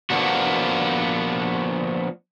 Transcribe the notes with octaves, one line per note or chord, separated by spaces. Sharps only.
F3 A#3 B3 D4 F#4